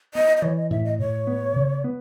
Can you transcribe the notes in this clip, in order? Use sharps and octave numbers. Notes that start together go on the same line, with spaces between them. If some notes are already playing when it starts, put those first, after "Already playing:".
B3 D#5
D#5
E3 C#5
D#5
A2 E5
D#5
A2 C#5
B3
C#3
B3